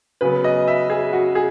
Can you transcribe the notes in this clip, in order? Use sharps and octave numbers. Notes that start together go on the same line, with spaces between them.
C#3 F#3 B3 B4
D#5
E5
G#4
F#4
G#4